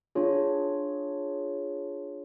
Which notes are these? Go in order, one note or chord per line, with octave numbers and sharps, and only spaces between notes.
D4 F4 G#4 C#5